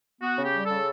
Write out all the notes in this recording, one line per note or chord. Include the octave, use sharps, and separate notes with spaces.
B3 F#4
C#3 G4
G3
A4
C#3